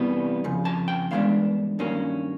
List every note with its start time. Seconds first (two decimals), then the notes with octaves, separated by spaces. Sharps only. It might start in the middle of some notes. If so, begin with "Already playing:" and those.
Already playing: E2 C3 E3 G3 B3
0.44 F2 C#3
0.65 A5
0.88 G5
1.11 G2 E3 G#3 B3 D4 F5
1.79 G2 D#3 F#3 A#3 C#4